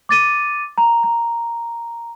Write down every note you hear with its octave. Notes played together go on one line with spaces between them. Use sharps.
D6 A6 D#7
A#5
A#5